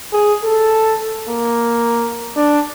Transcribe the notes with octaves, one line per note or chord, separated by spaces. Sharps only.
G#4
A4
A#3
D4